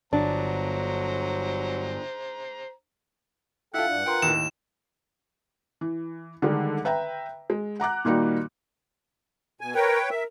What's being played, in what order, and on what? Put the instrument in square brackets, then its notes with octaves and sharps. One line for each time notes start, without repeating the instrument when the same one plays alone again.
[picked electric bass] G1 [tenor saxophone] F#3 [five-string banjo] D4 [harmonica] C5 A#5
[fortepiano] E4 F4 [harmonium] A4 G5 [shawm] F#5
[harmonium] G2 D4
[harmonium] F4 A#4 B4 [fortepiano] G5 C6
[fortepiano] D#2 A2 [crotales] E7
[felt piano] E3
D3 D#3 G3 G#3
B4 E5 G5 A#5
G#3
F#5 A#5 D6 F#6
A#2 D#3 G3 A#3 D#4 F#4
[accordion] B2 G#5
[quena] A#4 [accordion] B4 C#5 G5
[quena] A#4 [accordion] E5